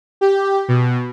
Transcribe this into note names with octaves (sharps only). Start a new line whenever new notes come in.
G4
B2